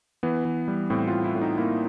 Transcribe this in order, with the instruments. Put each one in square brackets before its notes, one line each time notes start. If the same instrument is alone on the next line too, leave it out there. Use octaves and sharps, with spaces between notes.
[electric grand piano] E3 B3
E3
G3
A2 C4
A2 F4
E4
A2
D#4
A#3 E4